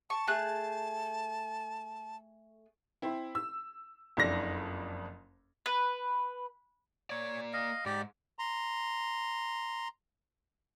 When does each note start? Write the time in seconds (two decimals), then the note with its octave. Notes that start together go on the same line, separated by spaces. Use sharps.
0.10 A5 C#6
0.27 A3 G#4 F#6
3.02 C4 E4
3.35 E6
4.17 F#1 F2 D4 A#6
5.66 B4
7.10 A#3 C#5 D5
7.53 D#5 F5
7.86 G#2 G4 D5
8.39 A#5 C6